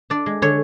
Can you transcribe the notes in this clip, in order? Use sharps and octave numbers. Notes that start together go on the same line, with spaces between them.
D4 D5
G#3
D3 C#5